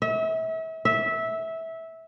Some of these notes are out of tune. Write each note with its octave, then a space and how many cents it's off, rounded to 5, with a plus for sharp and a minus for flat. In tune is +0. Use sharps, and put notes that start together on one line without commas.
E5 -35
E5 -15